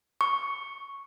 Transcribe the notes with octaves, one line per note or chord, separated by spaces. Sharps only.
C#6